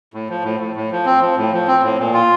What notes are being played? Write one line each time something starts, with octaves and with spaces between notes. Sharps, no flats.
A2
F3
A2
A2
A2
F3
C4
F3
A2
F3
C4
A2
A#2
F4